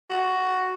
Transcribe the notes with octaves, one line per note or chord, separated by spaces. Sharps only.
F#4